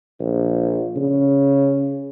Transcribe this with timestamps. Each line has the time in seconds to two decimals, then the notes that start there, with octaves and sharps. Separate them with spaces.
0.20 A#1
0.97 C#3